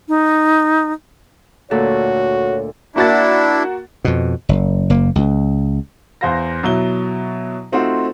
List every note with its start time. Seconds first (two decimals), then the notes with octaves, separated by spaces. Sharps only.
0.08 D#4
1.71 D2 A#2 F#4 A4 C#5
2.96 A#3 D4 E4 F#4 A6
4.05 F2 B2
4.49 F#1
4.90 F#1 A#3
5.15 C#2
6.21 E2 C5 F5 A#6
6.63 B2 F#3 E4 G7
7.72 A3 C4 D#4 F4 F#4